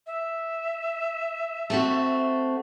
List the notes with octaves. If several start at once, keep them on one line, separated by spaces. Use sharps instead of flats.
E5
A3 C4 F#4